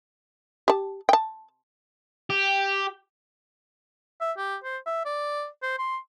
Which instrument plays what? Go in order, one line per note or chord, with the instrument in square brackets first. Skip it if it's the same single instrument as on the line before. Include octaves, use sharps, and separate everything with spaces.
[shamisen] G4 A5
G5 A5
[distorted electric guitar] G4
[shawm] E5
G4
C5
E5
D5
C5
C6